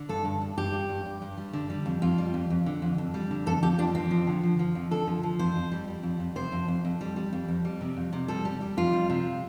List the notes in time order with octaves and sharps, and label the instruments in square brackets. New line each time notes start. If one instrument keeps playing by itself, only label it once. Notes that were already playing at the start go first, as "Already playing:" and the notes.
Already playing: [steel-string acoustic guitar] D3
G2 A4
G2
G2
G2 G4
G2
G2
G2
G2
G3
D3
G3
F2
F2 F4
G3
F2
F2
D3
F2
F2
G3
D3
F2 A4
F2 G4
F3 D4
F2 C4
F3
D3
F3
F3
F2
D3 A4
F3
F3
F2 C5
F2
G3
G3
F2
F2
C3 C5
F2
F2
F2
G3
G3
F2
F2
G3
C3
F2
C3
G3 A4
G3
G3
F2 F4
G3
C3